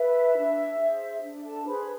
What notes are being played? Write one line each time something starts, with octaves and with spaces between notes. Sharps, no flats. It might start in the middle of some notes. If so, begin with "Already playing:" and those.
Already playing: B4 E5
D4
G#4 C5
D4 E5
A4 A5
G#4 B4 C5 B5